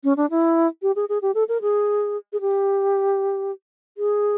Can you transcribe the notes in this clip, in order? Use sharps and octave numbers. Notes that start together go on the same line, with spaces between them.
C#4
D4
E4
G4
G#4
G#4
G4
A4
A#4
G#4
G#4
G4
G#4